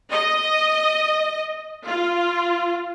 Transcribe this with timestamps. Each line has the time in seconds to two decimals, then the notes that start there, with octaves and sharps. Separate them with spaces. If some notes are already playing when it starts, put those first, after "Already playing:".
0.10 D#5
1.86 F4